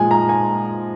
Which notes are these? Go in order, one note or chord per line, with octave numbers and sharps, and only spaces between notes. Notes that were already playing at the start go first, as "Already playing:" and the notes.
Already playing: A#2 F3 G#3 G#5
A#5
G#5